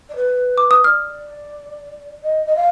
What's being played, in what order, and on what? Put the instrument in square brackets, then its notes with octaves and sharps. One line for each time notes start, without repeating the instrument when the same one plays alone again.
[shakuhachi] D5
B4
[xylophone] D6
D#6
[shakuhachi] D5 [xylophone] F6
[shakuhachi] D#5
D#5
F5